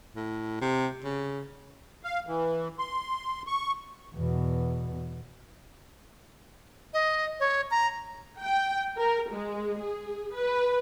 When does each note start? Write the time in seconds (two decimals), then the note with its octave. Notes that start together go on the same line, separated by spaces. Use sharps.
0.16 A2
0.61 C3
1.04 C#3
2.03 F5
2.27 E3
2.79 C6
3.47 C#6
4.15 E2 B2
6.94 D#5
7.40 C#5
7.71 A#5
8.40 G5
8.97 A#4
9.29 G#3
9.79 G#4
10.36 B4